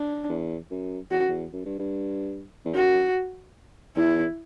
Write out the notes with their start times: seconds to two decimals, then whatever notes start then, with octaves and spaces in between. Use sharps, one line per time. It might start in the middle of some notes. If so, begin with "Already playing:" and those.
Already playing: D4
0.29 E2
0.71 F#2
1.11 E2 F#4
1.19 F#2
1.28 E2
1.53 F#2
1.65 G2
1.79 G2
2.65 E2
2.75 F#2 F#4
3.96 E2 E4